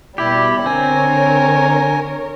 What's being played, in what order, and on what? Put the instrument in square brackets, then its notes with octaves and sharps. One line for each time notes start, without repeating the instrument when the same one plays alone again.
[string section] B2 G3 [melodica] E4 [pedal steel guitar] G4
[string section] D3 A#4 C#5 [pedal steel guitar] C4 [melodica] G#5